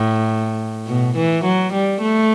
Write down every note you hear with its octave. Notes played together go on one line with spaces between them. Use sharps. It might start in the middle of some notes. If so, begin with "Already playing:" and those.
Already playing: A2
B2
E3
F#3
G3
A3